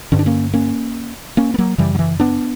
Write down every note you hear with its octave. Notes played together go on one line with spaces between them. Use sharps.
G2 D3 C#4
D4
A#3 C#4
A#3 C#4
A#3 C#4
B3
F#3 A#3
F#2 C#3 E3 G3
F#3
E3
B3 D4